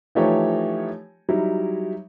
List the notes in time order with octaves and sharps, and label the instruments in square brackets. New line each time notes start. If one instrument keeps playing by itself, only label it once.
[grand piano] E3 F3 A3 D#4 G4 C#5
F#3 G3 D#4 E4